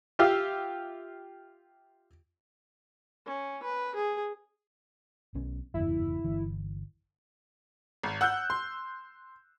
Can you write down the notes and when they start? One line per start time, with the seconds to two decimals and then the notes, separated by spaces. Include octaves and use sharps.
0.19 F4 G4 E5 F5
3.25 C#4
3.63 B4
3.95 G#4
5.34 B1 B2 C#4
5.74 F#1 E2 G2 E4
6.24 G1 E3
8.03 G#1
8.21 F#5 E6 F#6 G6
8.50 C6